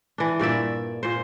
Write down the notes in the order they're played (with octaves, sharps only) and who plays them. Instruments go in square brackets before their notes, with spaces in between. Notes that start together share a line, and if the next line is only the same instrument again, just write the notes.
[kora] E3 D4
G2 A#2 D5 E5
A#2 C5